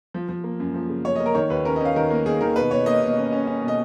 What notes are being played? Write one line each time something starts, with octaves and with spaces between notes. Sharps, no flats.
F3
F3
A#3
F#2
F3
C#3
F#2 C#5
A#3 D#5
A#4
D#3 C#5
D#2 B4
C#4 A#4
D#5
C#4 F5
D#3 A#4
A#3
D#3 G#4
D#3 A#4
B2 B4
B2 C#5
A#3 D#5
B2
C#4
C#4
C#4
B2
D#5